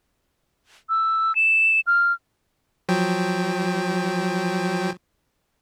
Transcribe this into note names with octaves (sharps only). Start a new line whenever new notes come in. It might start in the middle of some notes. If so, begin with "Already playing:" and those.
E6
E7
F6
F3 F#3 G5